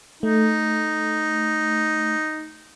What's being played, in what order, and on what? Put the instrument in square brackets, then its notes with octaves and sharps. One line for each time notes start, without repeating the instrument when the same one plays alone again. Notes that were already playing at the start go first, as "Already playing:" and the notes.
[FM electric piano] A3 [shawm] D#4